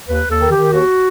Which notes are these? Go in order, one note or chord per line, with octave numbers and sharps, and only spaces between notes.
D#2 B4
D#2 A4
D#3
G4
D#3
D#2 F#4